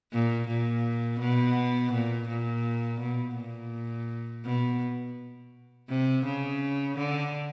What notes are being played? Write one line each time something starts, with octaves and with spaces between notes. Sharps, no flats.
A#2
A#2
B2
A#2
A#2
B2
A#2
B2
C3
C#3
D3